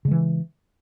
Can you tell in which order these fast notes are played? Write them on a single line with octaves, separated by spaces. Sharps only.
C#3 G#3 E3